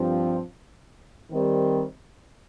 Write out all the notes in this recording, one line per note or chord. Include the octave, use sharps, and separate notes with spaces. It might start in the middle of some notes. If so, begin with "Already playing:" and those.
Already playing: G2 F3 C4
D#3 G3 C4